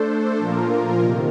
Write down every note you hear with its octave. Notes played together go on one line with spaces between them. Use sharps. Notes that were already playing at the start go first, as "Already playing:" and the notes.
Already playing: A3 D4 A4 C5
A#2 F3 A#3 F4 A#4
C3 D#3